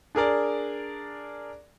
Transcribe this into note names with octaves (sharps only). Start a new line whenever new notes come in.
D4 G#4 A#4 D5